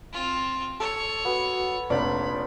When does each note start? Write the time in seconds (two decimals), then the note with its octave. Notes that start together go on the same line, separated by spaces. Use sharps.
0.13 C4 F4
0.80 A4 C#5
1.25 B3 F#4
1.90 F1 A#1 C#5 D5 B5